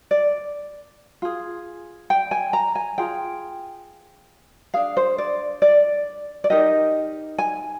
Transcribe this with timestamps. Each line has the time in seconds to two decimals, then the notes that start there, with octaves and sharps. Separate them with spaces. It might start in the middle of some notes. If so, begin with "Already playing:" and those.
0.11 D5
1.22 F4 G#4
2.10 G5
2.31 G#5
2.53 A#5
2.75 G#5
2.98 F4 G#4 G5
4.74 D4 G#4 F5
4.97 C5
5.18 D5
5.62 D5
6.44 D5
6.50 D#4 G4 A#4 D#5
7.38 G#5